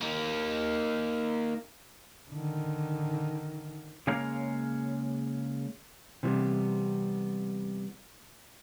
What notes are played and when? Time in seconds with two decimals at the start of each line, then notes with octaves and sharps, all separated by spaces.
0.01 A#3 D#4
2.31 D3 D#3
4.07 C#3 G#3 A#3 C#5 F5 A#5
6.23 C3 E3 G3 B3